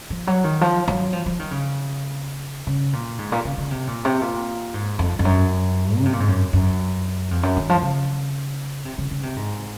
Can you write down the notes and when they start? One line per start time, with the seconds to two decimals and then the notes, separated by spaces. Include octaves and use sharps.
0.10 F3
0.27 F#3
0.44 D#3
0.61 F3
0.88 F#3
1.13 F3
1.26 F3
1.39 D#3
1.51 C#3
2.67 C#3
2.93 A#2
3.19 G#2
3.32 A#2
3.45 C#3
3.57 C#3
3.71 C3
3.87 A#2
4.05 C3
4.21 A#2
4.74 G#2
4.99 F2
5.19 F2
5.25 F#2
5.98 C#3
6.05 C3
6.13 A#2
6.20 G#2
6.28 F#2
6.53 F#2
7.31 F2
7.43 F#2
7.57 D#3
7.69 F3
7.82 C#3
8.85 C3
8.98 C#3
9.11 C#3
9.23 C3
9.36 G#2